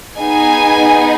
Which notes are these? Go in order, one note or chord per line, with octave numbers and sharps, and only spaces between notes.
B3 D#4 G#4 G#5